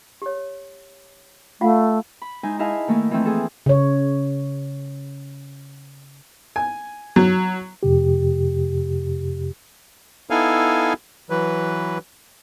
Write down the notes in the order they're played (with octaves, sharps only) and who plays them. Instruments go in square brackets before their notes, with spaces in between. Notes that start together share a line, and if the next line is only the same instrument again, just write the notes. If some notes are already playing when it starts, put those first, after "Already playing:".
[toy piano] G4 C#5
[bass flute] A3 [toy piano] F4 F5 F#5
[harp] B5
G#3 D#4 E4 C5 G#5
E4 G#4 D#5 F5 G#5 A5
D#3 A3 A#3 D#4 E4
E3 F3 A3 C4
G#4 A4
[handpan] C#3 C#5
[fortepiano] G#5
F#3
[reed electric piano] F2 C3 G4
[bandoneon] B3 D#4 E4 A4 F5 G#5
E3 F#3 B4